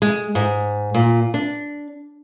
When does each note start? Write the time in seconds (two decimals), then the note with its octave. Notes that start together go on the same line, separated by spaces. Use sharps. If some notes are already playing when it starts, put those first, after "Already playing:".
0.02 G#3
0.35 G#2
0.94 A#2
1.34 D4